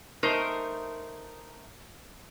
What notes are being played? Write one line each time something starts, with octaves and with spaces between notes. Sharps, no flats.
A3 D#4 A#4 C5